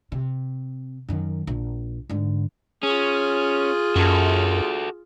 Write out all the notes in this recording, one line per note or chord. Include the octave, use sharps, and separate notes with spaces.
C3
F#2 D#3
A#1
G#2 D3
C#4 F4 G#4
F#2 F#4 A4